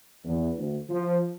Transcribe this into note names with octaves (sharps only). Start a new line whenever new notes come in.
E2
D2
F3